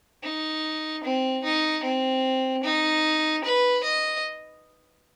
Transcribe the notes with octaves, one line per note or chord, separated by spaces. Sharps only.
D#4
C4
D#4
C4
D#4
B4
D#5